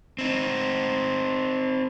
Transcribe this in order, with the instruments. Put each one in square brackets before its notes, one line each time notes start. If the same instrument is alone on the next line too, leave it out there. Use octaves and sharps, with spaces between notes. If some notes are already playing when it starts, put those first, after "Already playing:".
[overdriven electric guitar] C4 D#4